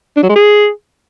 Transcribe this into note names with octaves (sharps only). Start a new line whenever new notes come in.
D4
F#3
G#3
G#4